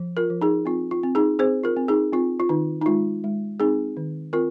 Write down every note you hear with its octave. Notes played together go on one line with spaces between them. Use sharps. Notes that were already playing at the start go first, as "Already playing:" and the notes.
Already playing: F3
F4 A#4
F3
D#4 G#4
C4 F4
F4
C4
D#4 G#4
C4 G#4 C5
F4 A#4
C4
D#4 G#4
C4 F4
F4
D#3 D#4
D#4
G#3 F4
G#3
C4 D#4 G#4
D#3
C4 F4 A#4